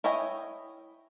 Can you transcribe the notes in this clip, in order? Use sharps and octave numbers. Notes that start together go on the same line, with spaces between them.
E4 C#5 D#5 G5 G#5